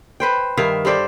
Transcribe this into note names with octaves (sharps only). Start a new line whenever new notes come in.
B4 C5 G5
G2 D#3 E5 F5
G3 A4 C5 D5